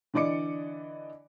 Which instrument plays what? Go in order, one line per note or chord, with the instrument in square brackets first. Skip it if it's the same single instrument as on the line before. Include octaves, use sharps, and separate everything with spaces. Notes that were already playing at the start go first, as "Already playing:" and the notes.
[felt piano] D3 E3 D5 D#5 D6 C#7